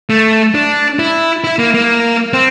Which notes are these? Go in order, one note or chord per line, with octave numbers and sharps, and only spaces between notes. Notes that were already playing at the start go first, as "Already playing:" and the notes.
A3
D4
E4
E4
A#3
A#3
C4